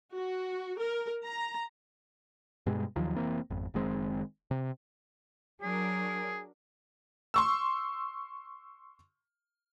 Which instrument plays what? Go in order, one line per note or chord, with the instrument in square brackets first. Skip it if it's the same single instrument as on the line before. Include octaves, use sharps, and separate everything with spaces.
[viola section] F#4
A#4
A#5
[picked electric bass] G2 B2 G3 G#3
D#2 D#3 F3 F#3
F1 E3 A#3 C4
G#1 F2
F#1 D#3 G#3 C4
C3
[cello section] F#3 D4 A#4 [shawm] G#4
[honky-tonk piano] C6 C#6 E6